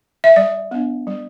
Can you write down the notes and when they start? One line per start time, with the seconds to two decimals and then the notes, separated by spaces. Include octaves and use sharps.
0.24 E5
0.36 G3 D5
0.71 B3 D4
1.07 G3